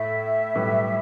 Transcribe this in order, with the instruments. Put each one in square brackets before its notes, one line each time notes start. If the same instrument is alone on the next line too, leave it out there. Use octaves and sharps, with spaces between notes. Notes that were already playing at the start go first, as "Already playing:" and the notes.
Already playing: [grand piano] A2 A3 E4 [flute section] E5
[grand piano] B1 A2 G3 E4 B4